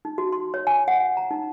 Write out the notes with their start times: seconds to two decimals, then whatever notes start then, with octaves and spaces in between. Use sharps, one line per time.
0.05 D#4
0.18 F#4
0.32 C6
0.54 C#5
0.67 G#5
0.88 F#5
1.17 A#5
1.31 D#4